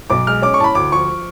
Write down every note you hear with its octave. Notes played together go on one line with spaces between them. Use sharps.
B1 D6
G#3 F6
C#4 D6
C#6
A2 A5 B5
D2 D6
F3 C#6